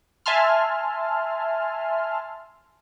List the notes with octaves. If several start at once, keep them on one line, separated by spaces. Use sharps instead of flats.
E5 G#5 A5 C6 F6